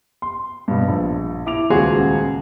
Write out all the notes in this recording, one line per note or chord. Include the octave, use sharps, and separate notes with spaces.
C6
G2 B2
A#1
E4 D6 F7
D#1 C#2 F4 F#4 G#4 C6